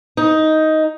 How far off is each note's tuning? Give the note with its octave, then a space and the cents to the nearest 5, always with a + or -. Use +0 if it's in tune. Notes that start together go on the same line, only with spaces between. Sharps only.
D#4 +10